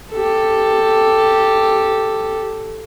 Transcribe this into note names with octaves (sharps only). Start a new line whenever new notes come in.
G4 A4